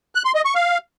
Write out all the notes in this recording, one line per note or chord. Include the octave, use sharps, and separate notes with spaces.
F#6
C6
D#5
C#6
F5